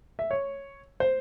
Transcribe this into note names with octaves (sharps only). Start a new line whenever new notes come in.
E5
C#5
C5